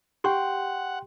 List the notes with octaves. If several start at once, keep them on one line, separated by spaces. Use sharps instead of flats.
G4 F#5 G5 C6 C#6